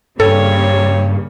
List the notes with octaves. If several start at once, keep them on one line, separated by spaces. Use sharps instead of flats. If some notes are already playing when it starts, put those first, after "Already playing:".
G2 C#3 G3 A#3 C4 A4 C#5